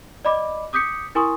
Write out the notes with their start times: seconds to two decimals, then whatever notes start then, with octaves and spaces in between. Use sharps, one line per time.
0.25 D5 D#5 B5 D6
0.73 D6 D#6 G6 B6 C#7
1.15 E4 A#4 G#5 C6 C#6 D#6